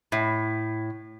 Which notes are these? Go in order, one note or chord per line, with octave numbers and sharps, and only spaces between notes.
A2